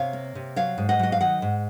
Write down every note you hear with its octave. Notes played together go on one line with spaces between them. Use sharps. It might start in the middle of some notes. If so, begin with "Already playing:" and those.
Already playing: C3 C#5 F5
A#3
C3
F#3 C#5 F5
G#2
D#5 F#5
F#3 D#5
F5
D#3 D#5 F#5
G#2